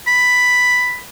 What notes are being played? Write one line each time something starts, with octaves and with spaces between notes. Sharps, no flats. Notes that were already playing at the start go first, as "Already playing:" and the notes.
B5